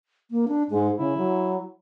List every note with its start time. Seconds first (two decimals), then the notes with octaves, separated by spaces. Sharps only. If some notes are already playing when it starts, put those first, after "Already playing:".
0.31 A#3
0.48 D4
0.70 G#2 G#3
0.98 C#3 E4
1.17 F#3